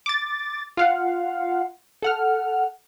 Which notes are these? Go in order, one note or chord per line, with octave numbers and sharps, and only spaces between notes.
D6 A6
F4 F5 F#5
A4 F#5 F6